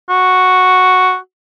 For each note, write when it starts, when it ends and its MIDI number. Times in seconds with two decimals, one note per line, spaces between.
0.09 1.17 66